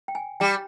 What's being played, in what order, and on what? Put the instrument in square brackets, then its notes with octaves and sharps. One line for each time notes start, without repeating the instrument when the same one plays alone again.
[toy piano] G5
G#5
[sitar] G3 [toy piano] G5